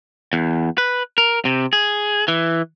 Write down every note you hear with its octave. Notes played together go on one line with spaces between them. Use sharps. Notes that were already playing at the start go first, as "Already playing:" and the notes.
E2
B4
A#4
C3
G#4
E3